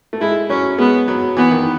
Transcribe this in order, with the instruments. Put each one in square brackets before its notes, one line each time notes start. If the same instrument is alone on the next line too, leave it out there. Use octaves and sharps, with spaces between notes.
[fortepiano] A3
[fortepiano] G#3 [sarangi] E4
[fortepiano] F#3 [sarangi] C#4
[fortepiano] G#3 [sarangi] B3
[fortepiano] F#3
[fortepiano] E3 [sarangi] B3
[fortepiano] D#3